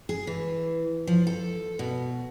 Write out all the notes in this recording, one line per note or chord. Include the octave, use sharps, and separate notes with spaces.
G#4
E3
F3
A4
B2